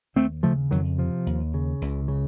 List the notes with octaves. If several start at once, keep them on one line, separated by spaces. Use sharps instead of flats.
D#2 A3 C4
C#3 F3 A3
F2 D#3 F#3
C3 F3
D#2
C#3
C#2
C#3